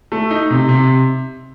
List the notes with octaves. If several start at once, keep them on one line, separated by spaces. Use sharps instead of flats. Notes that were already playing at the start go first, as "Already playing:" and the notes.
A3
D#4
C3
C3